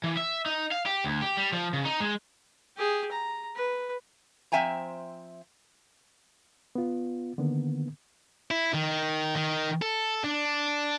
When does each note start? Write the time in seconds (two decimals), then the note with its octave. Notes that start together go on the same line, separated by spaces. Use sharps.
0.04 E3
0.17 E5
0.46 D#4
0.72 F5
0.86 G4
1.04 D2
1.21 G4
1.37 G3
1.53 F3
1.73 C#3
1.85 D#4
2.00 G#3
2.77 G4 G#4
3.12 A#5
3.55 B4
4.52 F3 C4 E5 G5 G#5 A#5
6.75 B3 F4
7.38 D3 D#3 A#3 B3
8.51 E4
8.74 D#3
9.36 D#3
9.82 A4
10.24 D4